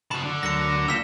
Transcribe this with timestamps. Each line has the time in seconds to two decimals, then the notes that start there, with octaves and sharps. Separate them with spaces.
0.11 F#4 A5 B5
0.23 D3
0.43 D2 F#3 A#4 A#6 C#7
0.88 A#3 F4 G5 E6 B6 E7